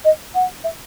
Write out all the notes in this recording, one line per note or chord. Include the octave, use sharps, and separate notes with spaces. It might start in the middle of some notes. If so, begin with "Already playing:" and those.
D#5
F#5
E5